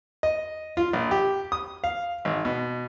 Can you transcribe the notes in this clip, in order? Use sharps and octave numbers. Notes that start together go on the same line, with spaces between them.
D#5
F4
A#1
G4
D#6
F5
G#1
B2